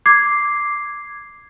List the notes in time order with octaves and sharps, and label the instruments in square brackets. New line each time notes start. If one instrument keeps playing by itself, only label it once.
[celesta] D6 G#6 C7